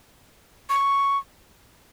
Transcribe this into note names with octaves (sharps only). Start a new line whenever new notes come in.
C#6